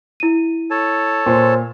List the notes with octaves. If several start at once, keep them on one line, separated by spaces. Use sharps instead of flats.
E4 D#7
A4 C#5 A5
A#2 C5